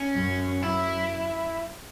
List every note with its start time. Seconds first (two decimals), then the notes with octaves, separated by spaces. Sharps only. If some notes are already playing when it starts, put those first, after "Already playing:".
Already playing: C#4
0.15 F#2
0.62 F#2 E4